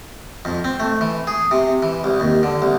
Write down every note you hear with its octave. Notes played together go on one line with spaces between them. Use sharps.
F2
C4
A3
E3
G#4
C3
E3
C2
D#2
D3
C2